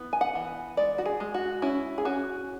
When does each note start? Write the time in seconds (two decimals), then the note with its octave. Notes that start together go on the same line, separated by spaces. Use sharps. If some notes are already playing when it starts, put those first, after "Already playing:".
Already playing: E3 B3
0.13 G#5
0.21 F#5
0.35 E3
0.77 G#3 D5
0.98 F#4
1.06 G#4
1.20 G#3
1.34 F#4
1.62 C#4 E4
1.98 G#4
2.05 C#4 F#4